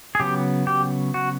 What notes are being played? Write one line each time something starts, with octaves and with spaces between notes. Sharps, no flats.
G#4
C#3 F#3 B3 G4
G4
F#4